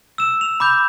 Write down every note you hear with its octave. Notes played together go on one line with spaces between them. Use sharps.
E6 E7
F7
B5 D6 G6